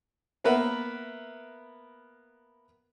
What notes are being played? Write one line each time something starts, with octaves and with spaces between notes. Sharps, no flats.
A#3 B3 A#4 B4 E5 F#5